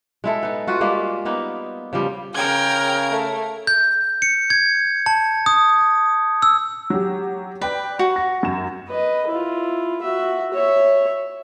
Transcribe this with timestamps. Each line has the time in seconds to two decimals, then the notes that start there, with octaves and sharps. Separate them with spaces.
0.24 G#3 E4 A4
0.43 B3 D#4
0.67 F4 F#4 B4
0.81 G3 G#3 A#3 F4
1.25 A#3 B3 D#4
1.93 C#3 F3 G3
2.35 C#3 A#4 G5 G#6
3.10 A3
3.67 G6
4.22 C#7
4.50 G#6
5.06 A5
5.46 D#6
6.42 E6
6.90 F#3 G4
7.61 B4 D5 G5 B5
7.99 F#4
8.16 A#6
8.43 F#2 E7
8.89 B4 D#5
9.28 E4 F4
10.02 F#4 E5
10.54 C#5 E5